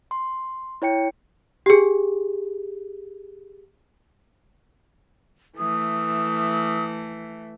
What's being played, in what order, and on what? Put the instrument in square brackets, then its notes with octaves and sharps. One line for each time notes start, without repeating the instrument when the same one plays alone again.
[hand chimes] C6
E4 C#5 G5 C#7
[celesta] G4 G#4
[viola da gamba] E3 A3 [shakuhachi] D#6